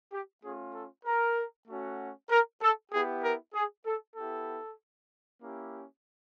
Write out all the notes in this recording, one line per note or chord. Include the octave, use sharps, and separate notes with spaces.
G4
A3 C#4 F4 G#4
A4
A#4
A3 C#4 F#4
A#4
A4
B3 E4 G4 G#4
A#4
G#4
A4
B3 E4 G4 A4
A#3 C#4 E4 G4